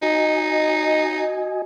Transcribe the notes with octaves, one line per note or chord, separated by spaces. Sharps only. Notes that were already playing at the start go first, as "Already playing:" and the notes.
D#4 F#4 D#5 G#5